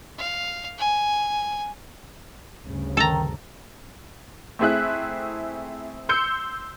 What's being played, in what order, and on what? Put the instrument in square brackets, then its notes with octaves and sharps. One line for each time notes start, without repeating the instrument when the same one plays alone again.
[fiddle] F5
G#5
[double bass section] D2 G2 C#3
[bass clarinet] D#3 [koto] A4 A#5
[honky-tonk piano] A3 C4 E4 G#4 E5 F#6
C6 E6 G6 C#7